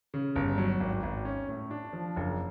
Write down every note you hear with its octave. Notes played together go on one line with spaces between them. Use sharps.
C#3
G1
F#3
G#1
G#1
C#4
A2
D4
F3
F#1